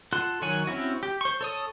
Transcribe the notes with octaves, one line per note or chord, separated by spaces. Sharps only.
F4 A4 F#5 C6 F#6
D#3 F#3 C#5 F#5 G#5
C4 C#4 E4 F#4
G4
C5 C#6
A4 C#5 D#6